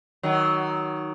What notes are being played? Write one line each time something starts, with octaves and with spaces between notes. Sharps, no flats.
D#3 F#3